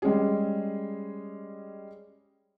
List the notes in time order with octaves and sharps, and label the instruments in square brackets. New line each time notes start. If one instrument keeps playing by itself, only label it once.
[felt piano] G3 G#3 C#4 G#4